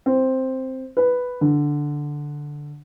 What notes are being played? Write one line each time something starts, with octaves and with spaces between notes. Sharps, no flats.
C4
B4
D3